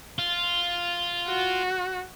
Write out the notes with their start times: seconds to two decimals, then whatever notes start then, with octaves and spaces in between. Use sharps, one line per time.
0.19 F4
1.28 F#4